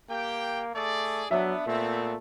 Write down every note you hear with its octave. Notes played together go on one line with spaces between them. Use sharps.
A#3 G4 G5
A3 G#4 D5
F#3 B3 D4 E5
A#2 A3 B3 C4